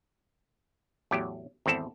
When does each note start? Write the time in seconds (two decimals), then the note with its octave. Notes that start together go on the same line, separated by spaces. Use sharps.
1.11 E2 A2 F#3 G4
1.66 G#1 E2 C4 E4 A4